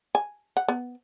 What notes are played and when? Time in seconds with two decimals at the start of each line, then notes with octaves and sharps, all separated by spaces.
0.15 G#5
0.57 F#5
0.68 B3